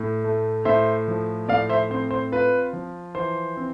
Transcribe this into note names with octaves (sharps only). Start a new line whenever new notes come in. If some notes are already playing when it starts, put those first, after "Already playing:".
Already playing: A2
A3
A2 C5 E5
F3
A2 D5 F5
C5 E5
C4 C5
C5
F4 B4
F3
E3 C5
C4